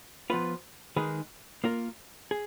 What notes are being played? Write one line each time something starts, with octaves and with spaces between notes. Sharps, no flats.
F3 B3 F4 B4
D#3 G#3 D#4 G#4 B4
A#3 F4 A#4
G#4